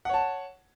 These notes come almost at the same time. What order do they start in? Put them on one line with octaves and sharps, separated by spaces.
F#5 C#5 A5